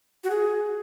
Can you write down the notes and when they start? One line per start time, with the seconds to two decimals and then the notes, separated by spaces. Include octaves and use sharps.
0.24 F#4
0.30 G#4